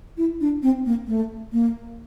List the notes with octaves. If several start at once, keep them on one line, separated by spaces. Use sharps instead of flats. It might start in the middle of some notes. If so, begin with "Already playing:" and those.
E4
D4
C4
A#3
A3
A#3